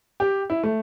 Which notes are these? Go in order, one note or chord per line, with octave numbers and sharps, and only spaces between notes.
G4
E4
A3